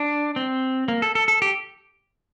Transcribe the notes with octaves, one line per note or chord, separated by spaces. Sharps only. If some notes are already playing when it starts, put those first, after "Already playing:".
Already playing: D4
C4
A#3
A4
A4
A4
G4